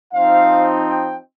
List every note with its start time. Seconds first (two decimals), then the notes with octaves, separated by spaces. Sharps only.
0.13 F3 C4 D#4 F5
0.88 G5